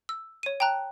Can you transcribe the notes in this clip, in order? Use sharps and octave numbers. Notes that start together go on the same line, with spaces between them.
E6
C#5 D#7
G5 A5 A#5 F#6